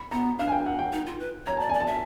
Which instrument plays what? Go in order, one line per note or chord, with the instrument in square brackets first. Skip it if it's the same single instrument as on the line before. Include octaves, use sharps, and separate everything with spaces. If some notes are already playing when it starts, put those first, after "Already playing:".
Already playing: [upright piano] B5
[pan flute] B3 [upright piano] A#5
[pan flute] D4 [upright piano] F5
[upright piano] G#5
G5
F#5
G5
[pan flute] D#4
F4
B4
[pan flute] C#5 [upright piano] A#5
[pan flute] D5 [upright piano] A5
[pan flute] D5 [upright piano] G#5
[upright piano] A5
[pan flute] E5